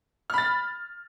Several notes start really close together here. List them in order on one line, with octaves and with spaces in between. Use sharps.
F6 B5 A6